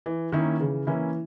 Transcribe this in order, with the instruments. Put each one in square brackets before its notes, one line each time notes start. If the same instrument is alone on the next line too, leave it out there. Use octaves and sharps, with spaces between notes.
[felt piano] E3
[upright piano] D#3 [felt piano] A#3 C#4 E4
[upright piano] C#3 [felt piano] E3
[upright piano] E3 [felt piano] A#3 C#4 E4